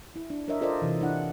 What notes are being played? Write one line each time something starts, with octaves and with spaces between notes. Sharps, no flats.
E4
D4
D4 A#4 C#5 D#5 E5
F4 A4 A#4 C5 D5 D#5
C3 E3
C4 D4 E4 F#5